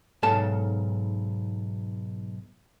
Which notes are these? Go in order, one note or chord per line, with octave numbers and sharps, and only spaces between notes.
B1 G#2 A4 A5